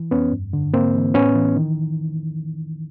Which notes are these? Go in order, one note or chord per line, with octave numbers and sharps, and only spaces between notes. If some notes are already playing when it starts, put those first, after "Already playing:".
Already playing: E3
F2 B3 C#4
G2
D3
G#2 A#3 C4
E3
A2 B3 C#4
E3
D#3